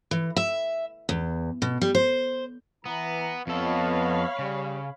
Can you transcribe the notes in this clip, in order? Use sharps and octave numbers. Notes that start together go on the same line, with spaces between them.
E3
E5
E2
B2
G3
C5
E3 B3 A#5
F2 B3 A4 C#5 D#5 F5 A5 B5
C#3 G3